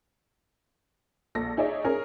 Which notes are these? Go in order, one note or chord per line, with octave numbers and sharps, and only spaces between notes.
A#1 A4 A#6
D#4 G#4 C#5 D5 E5
C#4 G#4 A#4